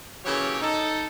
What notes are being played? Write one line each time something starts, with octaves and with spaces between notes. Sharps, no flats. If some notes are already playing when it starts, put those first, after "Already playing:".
C#3 E3 F#3 A#3 G4 C#5
D#4 A4